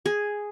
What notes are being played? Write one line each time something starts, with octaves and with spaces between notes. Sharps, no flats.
G#4